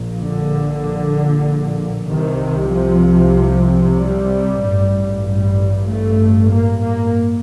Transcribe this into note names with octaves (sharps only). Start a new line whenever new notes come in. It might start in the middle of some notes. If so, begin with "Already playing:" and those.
Already playing: A#1 A#2
D3
C2 C3 D#3
F3
G3
A1 G2
G3
A3
A#3
A#3